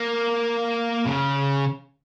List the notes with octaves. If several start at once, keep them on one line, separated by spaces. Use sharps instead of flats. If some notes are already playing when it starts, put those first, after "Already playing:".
Already playing: A#3
C#3